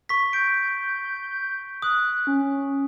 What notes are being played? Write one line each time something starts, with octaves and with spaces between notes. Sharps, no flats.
C#6 B6
G6 D7
D#6 F#6
C#4